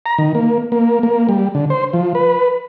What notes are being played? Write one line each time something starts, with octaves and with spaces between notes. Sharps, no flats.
A#5
D#3
A#3
A#3
A#3
G3
D3
C5
F3
B4